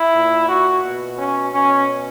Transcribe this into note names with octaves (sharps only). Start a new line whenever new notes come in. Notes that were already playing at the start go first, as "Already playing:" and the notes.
Already playing: E4
A#2
F#4
B2
C#4
B2 C#4